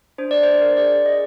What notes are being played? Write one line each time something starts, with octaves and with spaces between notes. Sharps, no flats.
D4 C5
D5
C5
D4
A#4
C5
G#4 D5
G#4 D#5